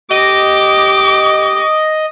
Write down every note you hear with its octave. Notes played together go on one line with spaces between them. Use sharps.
G4 D#5 D6